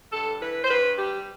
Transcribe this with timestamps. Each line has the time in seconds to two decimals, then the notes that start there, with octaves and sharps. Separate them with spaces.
0.13 G2 A4
0.41 E3 B4
0.64 C5
0.70 G2 B4
0.98 G3 G4